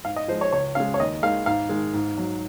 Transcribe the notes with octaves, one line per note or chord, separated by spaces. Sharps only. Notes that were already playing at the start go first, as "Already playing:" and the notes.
G#2 F5
D#5
F3 G#3 C5
C#5
C#2 C#5
C#3 G#3 F5
C#5
D#2 D#5
D#3 G#3 F5
G#2 F5
D#3 G#3
G#2
F#3